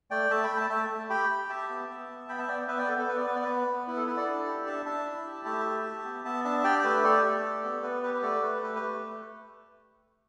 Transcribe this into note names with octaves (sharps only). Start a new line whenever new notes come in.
A3 D5 G5
A3 E5 A5
G5 B5
A3
E5 A5
A3 E5 A5
A3
G4 G5 B5
G4
G4 E5 A5
B3
B3
B3
B3 G5 B5
E5 A5
B3 D5 G5
B3 B4 E5
D5 G5
B3 A4
A4
B3 B4
D5
B3 B4
D5
B3 B4
B3
E4 B4
A4
E4 B4
A4 D5
D4
G4
D4 E5 A5
D4 E5 A5
E4
G4
A3 E5 A5
G4
G4
B3
B3 E5 A5
D4 E5 A5
G4 D5 G5
G5
A3 B4 E5
G4 A4 D5
A3
G4
B3
B3 B4
G4 B4
B4
A3 A4 D5
A3 B4
G4 B4
B4
A3